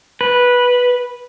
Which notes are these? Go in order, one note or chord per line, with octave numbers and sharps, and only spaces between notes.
B4